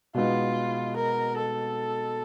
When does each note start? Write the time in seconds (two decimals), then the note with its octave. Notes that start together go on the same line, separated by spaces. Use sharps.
0.14 B2 G#3 B3 D#4 F4
0.96 A#4
1.38 A4